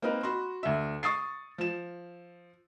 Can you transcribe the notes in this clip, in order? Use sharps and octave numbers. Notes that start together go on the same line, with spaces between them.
A#3 C4 D#4 A#4 B4
F#4 B5 C6
D2 E5
C#6 D#6 A6 C7
F3 E7